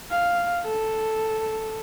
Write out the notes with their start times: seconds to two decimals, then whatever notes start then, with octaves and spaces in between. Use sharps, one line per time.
0.11 F5
0.64 A4